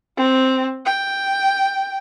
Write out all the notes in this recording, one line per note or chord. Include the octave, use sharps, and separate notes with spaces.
C4
G5